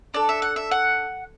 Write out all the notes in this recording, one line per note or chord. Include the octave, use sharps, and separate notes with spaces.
D4 A4 D5
E5
F#5
E5
F#5